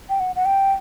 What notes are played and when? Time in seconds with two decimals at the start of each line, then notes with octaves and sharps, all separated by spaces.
0.09 G5
0.20 F#5
0.36 F#5
0.45 G5